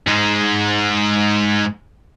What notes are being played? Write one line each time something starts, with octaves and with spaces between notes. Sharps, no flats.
G#2 G#3